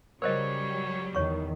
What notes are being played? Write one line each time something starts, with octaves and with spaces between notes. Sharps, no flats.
C#3 F#3 G3 A#4 C5 C#5 D#5
E2 D#3 C#5 C#6